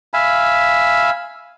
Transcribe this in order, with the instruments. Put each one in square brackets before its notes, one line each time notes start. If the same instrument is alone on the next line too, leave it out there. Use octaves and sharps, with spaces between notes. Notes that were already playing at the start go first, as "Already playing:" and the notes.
[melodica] E5 F5 G#5 B5